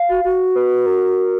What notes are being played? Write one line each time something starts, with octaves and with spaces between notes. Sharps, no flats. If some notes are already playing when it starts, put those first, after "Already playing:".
Already playing: F5
F#4
F#4
B4
A#4